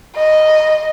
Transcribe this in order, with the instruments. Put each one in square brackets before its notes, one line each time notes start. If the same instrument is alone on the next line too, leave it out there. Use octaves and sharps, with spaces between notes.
[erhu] D#5